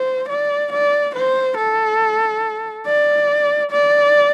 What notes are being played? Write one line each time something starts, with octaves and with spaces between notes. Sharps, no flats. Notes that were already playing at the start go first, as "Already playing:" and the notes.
Already playing: C5
D5
D5
C5
A4
D5
D5